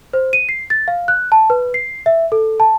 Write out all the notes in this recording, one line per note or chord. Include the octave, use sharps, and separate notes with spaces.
C5
D#7
C7
A6
F5
F#6
A5
B4
C7
E5
A4
A5